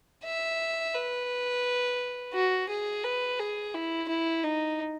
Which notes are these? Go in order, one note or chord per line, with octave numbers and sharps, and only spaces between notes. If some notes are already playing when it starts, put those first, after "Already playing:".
E5
B4
F#4
G#4
B4
G#4
E4
E4
D#4